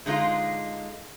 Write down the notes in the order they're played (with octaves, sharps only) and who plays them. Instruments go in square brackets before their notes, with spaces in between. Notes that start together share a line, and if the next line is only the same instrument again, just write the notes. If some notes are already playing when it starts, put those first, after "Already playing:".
[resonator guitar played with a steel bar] D3 G#3 D#4 F4